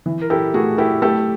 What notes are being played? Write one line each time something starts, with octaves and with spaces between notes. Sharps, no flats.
E3
A#4
E4 G4 A4
A3 F#4 G#4
E4 G4 A4
A3 G4 A4